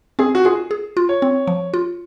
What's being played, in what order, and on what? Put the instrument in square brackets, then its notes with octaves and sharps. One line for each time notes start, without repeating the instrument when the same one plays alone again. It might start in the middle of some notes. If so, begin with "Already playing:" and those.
[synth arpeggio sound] C4 [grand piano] G#4
[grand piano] F#4
[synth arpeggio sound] F4 [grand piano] G#4
[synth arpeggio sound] G#4
F4
[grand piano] C#5
[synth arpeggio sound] C4
F3
F4